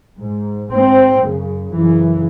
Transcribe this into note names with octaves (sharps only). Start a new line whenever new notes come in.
G#2
G#2 C4
F#2 C#3
F#2 C#3 E3